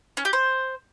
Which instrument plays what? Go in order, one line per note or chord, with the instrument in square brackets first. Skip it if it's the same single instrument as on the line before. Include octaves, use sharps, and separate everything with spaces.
[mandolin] C#4
G4
C5